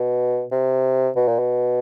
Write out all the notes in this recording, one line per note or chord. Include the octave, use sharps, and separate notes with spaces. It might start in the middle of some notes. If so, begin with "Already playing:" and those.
Already playing: B2
C3
B2
A#2
B2